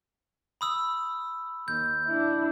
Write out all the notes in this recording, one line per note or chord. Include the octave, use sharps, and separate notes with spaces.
B5 D#6 E6
D#2 G6
D4 E4